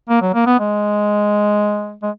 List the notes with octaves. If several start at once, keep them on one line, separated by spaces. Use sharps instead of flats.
A#3
F#3
A#3
B3
G#3
G#3